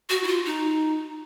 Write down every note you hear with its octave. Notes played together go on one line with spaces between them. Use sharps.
F#4
E4
F4
D#4